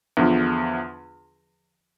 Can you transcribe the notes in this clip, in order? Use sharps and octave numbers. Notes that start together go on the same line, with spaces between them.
E2 D3 F3